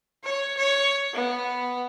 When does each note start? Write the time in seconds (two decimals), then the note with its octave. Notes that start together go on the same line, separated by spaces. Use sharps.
0.24 C#5
0.57 C#5
1.14 B3